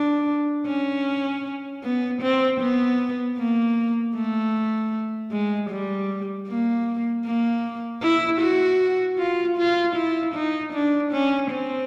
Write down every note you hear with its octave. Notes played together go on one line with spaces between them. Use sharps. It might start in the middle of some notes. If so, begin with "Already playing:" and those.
Already playing: D4
C#4
B3
C4
B3
A#3
A3
G#3
G3
A#3
A#3
E4
F#4
F4
F4
E4
D#4
D4
C#4
C4